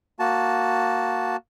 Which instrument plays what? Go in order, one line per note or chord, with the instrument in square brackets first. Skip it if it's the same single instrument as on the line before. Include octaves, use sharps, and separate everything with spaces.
[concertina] A#3 F#4 A5